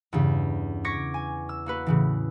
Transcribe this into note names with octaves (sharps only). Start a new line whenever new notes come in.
E2 G2 C#3
C#6 D6 G#6 A#6 B6 C#7
G#5
E6
A#3 F#4 B4
A2 C#3 E3